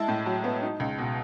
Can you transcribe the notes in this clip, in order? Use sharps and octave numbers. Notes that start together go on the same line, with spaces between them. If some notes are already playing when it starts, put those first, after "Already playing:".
Already playing: G#3 E4 A5
A2
F#3
B3
D#4
C#2
B2